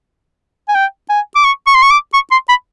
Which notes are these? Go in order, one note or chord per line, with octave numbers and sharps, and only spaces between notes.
G#5
G5
G#5
D6
C#6
C#6
C6
C#6
D6
C#6
C6
B5